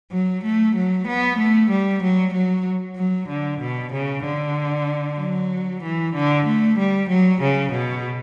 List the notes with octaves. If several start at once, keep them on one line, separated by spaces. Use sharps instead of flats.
F#3
A3
F#3
B3
A3
G3
F#3
F#3
F#3
D3
B2
C#3
D3
F#3
E3
D3
A3
G3
F#3
C#3
B2